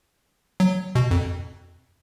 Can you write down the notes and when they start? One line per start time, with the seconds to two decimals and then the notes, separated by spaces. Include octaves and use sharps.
0.60 F#3
0.95 B2
1.11 F2